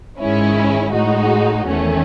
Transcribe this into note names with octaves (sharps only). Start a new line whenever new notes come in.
G#2 D#3 G#3 C#4 E4
A2 G#3 D#4 F#4
E2 D#3 A3 C#4